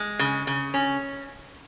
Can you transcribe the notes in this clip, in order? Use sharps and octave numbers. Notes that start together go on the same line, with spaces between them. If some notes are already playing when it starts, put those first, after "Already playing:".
Already playing: G#3
C#3
C#3
C#4